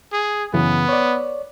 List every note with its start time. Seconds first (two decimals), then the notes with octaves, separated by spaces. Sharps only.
0.12 G#4
0.54 F#2 C#3 E3 B3
0.89 C#5 D5